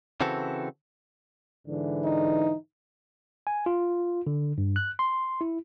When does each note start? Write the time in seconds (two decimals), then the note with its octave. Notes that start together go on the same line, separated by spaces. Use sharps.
0.21 C#3 E3 C4 F#4 A4
1.67 G#2 D3 E3
2.04 D#4
3.47 G#5
3.66 F4
4.27 D3
4.58 G2
4.76 F#6
4.99 C6
5.41 E4